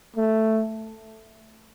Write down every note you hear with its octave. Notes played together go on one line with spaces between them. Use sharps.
A3